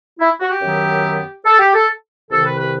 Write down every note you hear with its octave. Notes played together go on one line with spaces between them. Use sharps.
E4
F#4
G4
F#2 D#3 F#3 B3
A4
G4
A4
C2 C3 D#3 A4
B4
B4